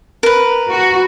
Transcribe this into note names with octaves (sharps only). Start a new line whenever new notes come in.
A#4 B4
F#4